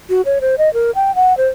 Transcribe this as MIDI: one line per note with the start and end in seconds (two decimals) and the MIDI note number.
0.09 0.21 66
0.25 0.39 73
0.41 0.55 72
0.58 0.72 75
0.74 0.91 70
0.95 1.14 79
1.15 1.36 78
1.37 1.47 72